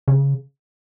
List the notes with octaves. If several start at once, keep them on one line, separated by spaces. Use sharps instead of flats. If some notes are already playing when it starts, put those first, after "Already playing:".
C#3